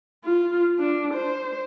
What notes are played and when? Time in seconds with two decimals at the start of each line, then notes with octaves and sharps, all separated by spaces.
0.24 F4
0.79 D4
1.14 C5